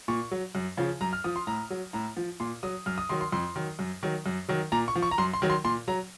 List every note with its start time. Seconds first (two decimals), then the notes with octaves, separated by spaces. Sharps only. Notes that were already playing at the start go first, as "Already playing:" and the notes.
0.08 A#2 C#6
0.31 F#3
0.55 F#2
0.77 C#3 F3
1.01 F#2 A#5
1.13 F6
1.24 F3 D#6
1.36 C6
1.47 A2 A#5
1.70 F#3
1.93 A2 A#5
2.17 F3
2.40 A#2 C6
2.63 F#3 D#6
2.86 F#2 F6
2.98 D#6
3.09 D#3 F#3 C6
3.21 C6
3.32 F2 C6
3.56 D#3 F#3
3.79 F#2
4.03 D#3 F#3
4.26 F#2
4.49 D#3 F#3
4.72 A#2 A#5
4.88 C#6
4.96 F3
5.02 C#6
5.11 A#5
5.18 F#2 C6
5.33 C6
5.42 D#3 F#3
5.50 C6
5.64 A#2 C6
5.88 F#3 A#5